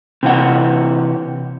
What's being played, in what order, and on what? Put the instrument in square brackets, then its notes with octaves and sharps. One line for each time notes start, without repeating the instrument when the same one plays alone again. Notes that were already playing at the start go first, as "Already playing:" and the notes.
[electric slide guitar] C3 E3 F#5